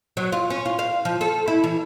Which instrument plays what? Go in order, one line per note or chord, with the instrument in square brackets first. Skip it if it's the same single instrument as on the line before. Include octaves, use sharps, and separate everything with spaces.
[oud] F#3
F4
C#4
F4
F5
F3
A4
E4
E3